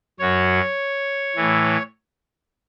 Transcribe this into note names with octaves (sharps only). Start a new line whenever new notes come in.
F#2 F#3 C#5
A2 E3